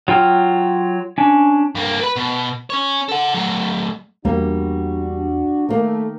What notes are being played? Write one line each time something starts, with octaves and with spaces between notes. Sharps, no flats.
F#3 F4 G5 F6
C#4 D4
G2 A#3
B4 B5
B2
C#4 C#5
A4 F#5
F#3 A3
E2 G3 A#3 D4 F#4
D#3 A3 A#3